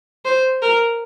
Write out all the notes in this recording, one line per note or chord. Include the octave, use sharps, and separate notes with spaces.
C5
A#4